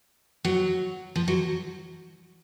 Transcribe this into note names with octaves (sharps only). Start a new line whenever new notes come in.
F#3
F3
F#3